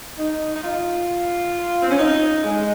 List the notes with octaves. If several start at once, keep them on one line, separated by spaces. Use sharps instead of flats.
D#4
D#4
F4
C4
C#4
D#4
G#3